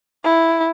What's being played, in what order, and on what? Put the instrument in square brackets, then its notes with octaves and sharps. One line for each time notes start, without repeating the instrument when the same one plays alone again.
[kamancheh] E4